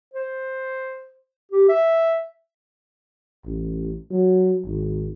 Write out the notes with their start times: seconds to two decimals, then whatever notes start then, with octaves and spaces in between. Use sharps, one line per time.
0.13 C5
1.52 G4
1.69 E5
3.45 A1
4.11 F#3
4.66 G#1